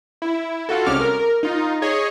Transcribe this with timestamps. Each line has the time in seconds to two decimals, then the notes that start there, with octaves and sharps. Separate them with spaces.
0.22 E4
0.69 F4 F#4 A4
0.86 C2 G#3 C#4 D6 F6
1.00 A#4
1.43 D#4 F4
1.82 G#4 C#5 D#5